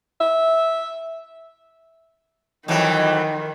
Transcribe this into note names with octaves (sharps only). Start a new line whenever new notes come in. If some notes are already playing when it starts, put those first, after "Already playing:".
E5
F2 D#3 E3 F#3